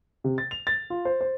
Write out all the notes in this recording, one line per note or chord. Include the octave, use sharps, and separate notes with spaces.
C3
A6
F7
A6
F4
C5
C5